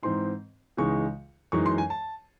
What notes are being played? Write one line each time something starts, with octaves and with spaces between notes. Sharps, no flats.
G#2 E3 C4 D#4 C6
C#2 C#3 E3 G#3 D#4 C#6
F#2 E3 G#3 D#4 C#6
C6
G#5
A5